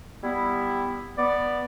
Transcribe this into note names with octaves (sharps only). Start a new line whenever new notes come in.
G3 B3 E4
B3 D5